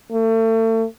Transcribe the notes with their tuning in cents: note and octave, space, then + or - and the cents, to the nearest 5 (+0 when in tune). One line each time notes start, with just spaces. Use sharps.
A3 +35